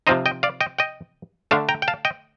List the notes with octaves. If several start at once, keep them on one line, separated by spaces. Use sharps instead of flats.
C3 F3 C4 D#4 C5 D#5
D#5 G5
D5 F5
D#5 G5
D#5 G5
D3 A3 D4 F5 A5
G5 A#5
G5
F5 A5
D#5 G5